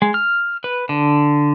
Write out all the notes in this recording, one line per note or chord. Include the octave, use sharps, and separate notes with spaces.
G#3
F6
B4
D3